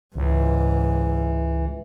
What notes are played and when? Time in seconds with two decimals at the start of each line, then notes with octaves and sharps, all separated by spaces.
0.16 C#2 G#2 E3